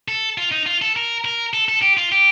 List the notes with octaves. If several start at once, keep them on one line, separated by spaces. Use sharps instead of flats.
A4
F4
D#4
F4
A4
A#4
A#4
A4
A4
G4
F4
G4